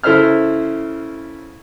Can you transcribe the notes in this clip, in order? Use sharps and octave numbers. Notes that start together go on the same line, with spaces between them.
C#3 E4 A4 C5 E5 F6